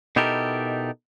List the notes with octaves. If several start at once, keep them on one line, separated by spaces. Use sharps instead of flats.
B2 D#4 E4 G4 A4 A#4